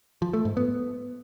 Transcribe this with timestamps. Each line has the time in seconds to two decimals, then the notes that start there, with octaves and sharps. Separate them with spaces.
0.22 F3
0.33 A3
0.45 G#2
0.57 B3